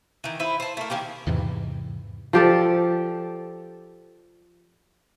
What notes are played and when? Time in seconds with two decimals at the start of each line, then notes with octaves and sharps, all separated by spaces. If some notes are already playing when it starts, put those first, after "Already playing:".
0.24 D#3 E3
0.40 E4 B4 C5
0.60 C5 A5
0.77 A3 A#3
0.90 D#3 A#3 C#4 G4
1.27 E2 G#2 C3 E3
2.33 F3 G4 A4 D5